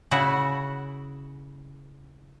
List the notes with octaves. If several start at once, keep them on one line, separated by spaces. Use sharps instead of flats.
C#3 E4 F#4